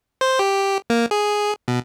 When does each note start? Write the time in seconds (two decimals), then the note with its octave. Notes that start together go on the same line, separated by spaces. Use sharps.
0.21 C5
0.39 G4
0.90 A#3
1.11 G#4
1.68 B2